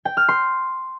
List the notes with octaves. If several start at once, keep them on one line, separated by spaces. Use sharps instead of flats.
G5
F6
C6